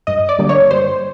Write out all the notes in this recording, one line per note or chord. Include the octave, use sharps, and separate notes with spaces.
G2 D#5
D5
D3 G3 A#3
C#5
G2 C5